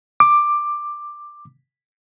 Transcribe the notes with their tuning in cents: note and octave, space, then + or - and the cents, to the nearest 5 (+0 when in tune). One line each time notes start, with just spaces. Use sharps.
D6 +10